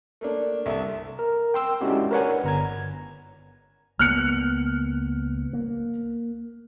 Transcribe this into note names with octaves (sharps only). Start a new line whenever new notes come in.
A3 A#3 D4
C2 A4 E5
A#4
G5 C6 E6
G#3 C#4 D4 E4 F#4 G4
A#4 B4 C#5 D5 F#5 G#5
G1 A#5 G#6
C#2 A#3 B3 F6 F#6 C#7
A#3